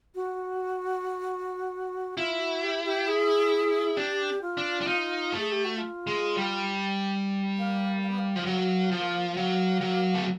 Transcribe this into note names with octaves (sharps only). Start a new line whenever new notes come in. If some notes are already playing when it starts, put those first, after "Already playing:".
F#4
E4 F4
F#4
G4
G4
G#4
D4 G4
F4
D4
D4
D#4
A3
G#4
G4
F#4
F4
G#3
G3
A#3
A#3
B3
A#3
F3
F#3 A#3
F3
F#3 A#3
F#3
A3